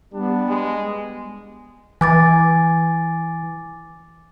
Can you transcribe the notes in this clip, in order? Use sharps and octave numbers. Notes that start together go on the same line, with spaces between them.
G3 B3 D4
G#3
E3 G#5 D6 A6